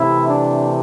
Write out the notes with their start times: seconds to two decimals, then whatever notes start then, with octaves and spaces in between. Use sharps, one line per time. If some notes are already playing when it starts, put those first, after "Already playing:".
Already playing: C3 E3 A3 E4
0.29 D4